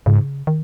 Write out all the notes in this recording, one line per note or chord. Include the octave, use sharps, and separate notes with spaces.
G#2 C#3
D#3